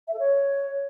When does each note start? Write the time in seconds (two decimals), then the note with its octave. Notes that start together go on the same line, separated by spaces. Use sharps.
0.07 E5
0.13 A4
0.19 C#5